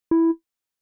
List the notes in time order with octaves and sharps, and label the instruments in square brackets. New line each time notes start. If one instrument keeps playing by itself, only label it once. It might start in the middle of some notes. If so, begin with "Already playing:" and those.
[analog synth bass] E4